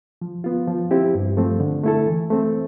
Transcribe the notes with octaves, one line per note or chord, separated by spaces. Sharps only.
F3
B3 F4
F3
C4 E4 G4
G2
F3 A3 C4
D3
A3 E4 A4
E3
A3 C4